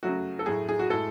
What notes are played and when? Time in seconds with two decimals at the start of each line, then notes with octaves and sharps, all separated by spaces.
0.03 C#3 F#3 A3 F#4
0.39 A4
0.46 A2 F#3 A3 G#4
0.69 G#4
0.79 F#4
0.90 A2 G#3 A4